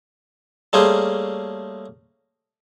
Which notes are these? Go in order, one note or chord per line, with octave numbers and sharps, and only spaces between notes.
G3 A3 A#3 C#4 G#4 C5